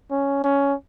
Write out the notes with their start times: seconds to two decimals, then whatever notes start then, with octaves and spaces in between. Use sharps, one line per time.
0.11 C#4
0.44 C#4